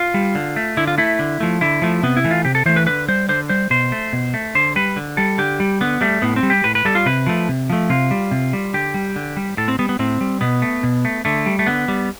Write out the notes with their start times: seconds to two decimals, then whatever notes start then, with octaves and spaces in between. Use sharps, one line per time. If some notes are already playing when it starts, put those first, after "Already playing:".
Already playing: F4
0.14 G3
0.35 D3
0.56 A3
0.77 D3 E4
0.87 F4
0.98 A3 E4
1.19 D3
1.40 F3 A3
1.61 D3 E4
1.82 F3 A3
2.03 C3 B3
2.17 E4
2.24 E3 A3
2.31 F4
2.45 C3 G4
2.55 A4
2.66 E3 A3 C5
2.76 B4
2.86 D3 B4
3.08 G3 C5
3.29 D3 C5
3.49 G3 C5
3.70 B2 C5
3.92 A3
4.13 B2
4.34 A3
4.55 D3 C5
4.76 G3 B4
4.96 D3
5.17 G3 A4
5.38 D3 G4
5.60 G3
5.81 D3 B3
6.01 G3 A3
6.22 A2 B3
6.36 C4
6.43 G3
6.50 G4
6.64 A2 B4
6.75 B4
6.85 G3 A4
6.95 F4
7.06 C3 B4
7.27 F3 A3
7.49 C3
7.70 F3 A3
7.89 C3 F4
8.11 G3
8.31 C3
8.53 G3
8.74 D3 G4
8.94 G3
9.16 D3
9.37 G3
9.57 A2 A4
9.68 C4
9.79 G3 B3
9.89 B3
9.99 A2 C4
10.21 G3
10.41 B2 B3
10.62 A3
10.83 B2
11.05 A3
11.25 D3 A3
11.46 G3
11.59 A3
11.67 D3 B3
11.88 G3